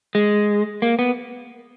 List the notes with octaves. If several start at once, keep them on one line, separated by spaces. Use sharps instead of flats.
G#3
A#3
B3